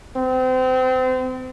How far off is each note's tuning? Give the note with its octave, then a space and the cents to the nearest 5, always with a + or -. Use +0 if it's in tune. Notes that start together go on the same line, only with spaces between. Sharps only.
C4 -30